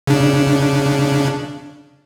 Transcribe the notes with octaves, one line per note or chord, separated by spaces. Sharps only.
C#3 D4